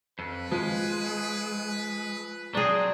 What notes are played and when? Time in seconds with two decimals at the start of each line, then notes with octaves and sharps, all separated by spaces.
0.19 F2 B4
0.52 F3 G#3
2.54 F#3 C4 D4 G#4